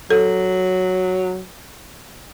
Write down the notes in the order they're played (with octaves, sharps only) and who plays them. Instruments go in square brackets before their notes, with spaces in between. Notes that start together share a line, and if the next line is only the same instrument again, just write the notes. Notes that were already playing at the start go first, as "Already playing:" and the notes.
[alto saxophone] F#3 [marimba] A4